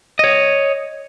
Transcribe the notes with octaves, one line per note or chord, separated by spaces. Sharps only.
C#5 D#5